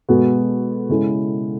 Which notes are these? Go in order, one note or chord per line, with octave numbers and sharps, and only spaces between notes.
B2 G#3 B3 F#4 A4
C#3 G#3 C#4 E4 A4